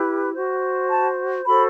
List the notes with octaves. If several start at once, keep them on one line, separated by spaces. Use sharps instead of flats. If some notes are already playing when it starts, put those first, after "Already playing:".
Already playing: E4 G4 B4
F#4 C5
A5
F#4 A4 C5 B5